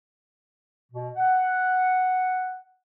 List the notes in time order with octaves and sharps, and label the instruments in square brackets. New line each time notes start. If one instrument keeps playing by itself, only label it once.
[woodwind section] B2
F#5